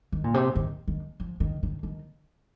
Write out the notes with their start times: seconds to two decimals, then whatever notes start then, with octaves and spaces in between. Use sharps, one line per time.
0.12 D#3
0.24 A#2
0.34 C3
0.55 D#3
0.88 D#3
1.20 F3
1.40 D#3
1.63 D#3
1.83 D#3